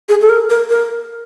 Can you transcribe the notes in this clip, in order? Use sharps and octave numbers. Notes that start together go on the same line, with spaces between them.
G#4
A4
A#4
A#4
A#4